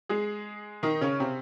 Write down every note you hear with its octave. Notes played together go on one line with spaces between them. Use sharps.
G#3 G#4
D#3 D#4
C#3 C#4
C3 C4